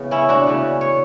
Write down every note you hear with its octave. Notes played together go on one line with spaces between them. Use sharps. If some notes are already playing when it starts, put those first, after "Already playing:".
Already playing: C#3 E3 B3
C#4 E4
D4 F#4
C#3 E3 B3
C#5